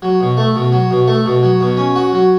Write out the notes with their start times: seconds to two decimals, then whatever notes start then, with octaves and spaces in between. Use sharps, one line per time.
0.02 F#3
0.21 B2
0.37 A3
0.56 B2
0.72 F#3
0.91 B2
1.08 A3
1.26 B2
1.43 F#3
1.61 B2
1.77 C#4
1.96 F#4
2.13 F#3